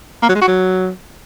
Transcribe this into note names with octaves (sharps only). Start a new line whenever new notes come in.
A#3
F#3
G#3
F#4
F#3